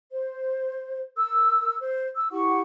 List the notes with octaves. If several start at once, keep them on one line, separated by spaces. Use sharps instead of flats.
C5
A#4 E6
C5
E6
E4 G4 F#5 C#6